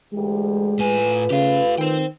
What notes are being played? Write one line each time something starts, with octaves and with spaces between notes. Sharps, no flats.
D2 E3 G#3 G4
A2 A3 F4 B4 G#5
C#3 G4 F5
D#3 C5 G5